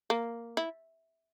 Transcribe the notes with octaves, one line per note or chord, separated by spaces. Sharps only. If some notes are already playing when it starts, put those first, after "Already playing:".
A#3
E4